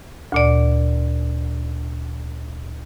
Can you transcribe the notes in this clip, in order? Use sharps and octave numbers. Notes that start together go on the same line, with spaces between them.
D2 A#2 D5